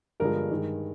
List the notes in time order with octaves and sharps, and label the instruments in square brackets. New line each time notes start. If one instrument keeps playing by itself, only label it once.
[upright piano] G2 D3 F3 G#3 A#4
G2 D#3 G#3